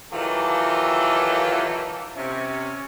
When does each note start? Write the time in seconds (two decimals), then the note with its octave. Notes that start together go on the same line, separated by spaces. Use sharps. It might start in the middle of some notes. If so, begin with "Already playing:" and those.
0.12 D#3 E3 F#3 F4 G4 A4
2.16 C3 C#4